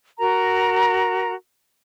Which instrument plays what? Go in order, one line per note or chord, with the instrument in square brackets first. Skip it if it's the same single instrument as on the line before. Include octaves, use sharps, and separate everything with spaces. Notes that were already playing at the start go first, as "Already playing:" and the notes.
[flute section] F#4 A#4 A#5